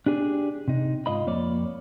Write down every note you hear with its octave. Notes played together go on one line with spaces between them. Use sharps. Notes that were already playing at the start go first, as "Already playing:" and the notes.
D4 G4 G#4 D5
C3 D#4
G#2 F4 D#5 B5
F2 A#3 C#5 D5